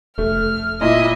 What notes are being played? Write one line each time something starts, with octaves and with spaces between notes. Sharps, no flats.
F1 A3 F6
A#2 E4 D#5 E5